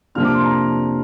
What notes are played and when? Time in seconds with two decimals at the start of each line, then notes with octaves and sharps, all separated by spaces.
0.15 F2 C3 A#3 D4 F4 F6
0.25 D6
0.34 C6
0.44 A#5